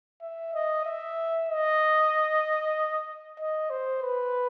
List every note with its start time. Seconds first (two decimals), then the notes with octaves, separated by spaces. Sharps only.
0.22 E5
0.54 D#5
0.85 E5
1.49 D#5
3.39 D#5
3.70 C5
4.02 B4